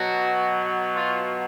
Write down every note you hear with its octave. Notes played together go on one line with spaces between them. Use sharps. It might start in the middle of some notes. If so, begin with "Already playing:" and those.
Already playing: B2 F#3 F#4
F4